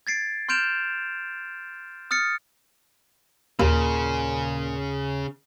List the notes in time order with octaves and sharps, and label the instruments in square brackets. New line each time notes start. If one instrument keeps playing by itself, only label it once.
[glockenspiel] G#6 A6 C7 D7
C6 F6 G6 D7 E7 F7
D#6 F6 A6 C#7
[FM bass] D#2 [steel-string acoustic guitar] A#2 [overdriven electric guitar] C#3